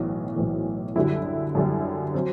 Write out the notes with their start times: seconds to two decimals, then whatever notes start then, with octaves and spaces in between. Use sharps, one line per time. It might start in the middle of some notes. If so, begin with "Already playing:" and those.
Already playing: B1 A2 E3
0.36 B1 A2 E3
0.96 F#2 D3 G3 E4
1.55 F#2 D3 G3
2.14 F#3 C4